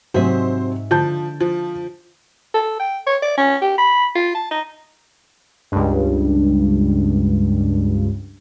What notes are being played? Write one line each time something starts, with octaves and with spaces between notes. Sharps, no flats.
G#2 C3 F#3 G#3 C5 E5
D3 F3 A5 G6
F3
A4
G5
C#5
D5
C#4
G4
B5
F4
A5
D#4
C#2 G2